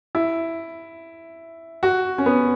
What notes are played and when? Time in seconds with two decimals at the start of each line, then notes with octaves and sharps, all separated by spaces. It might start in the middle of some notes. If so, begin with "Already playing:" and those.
0.15 E4
1.83 F#4
2.18 C#4
2.26 B3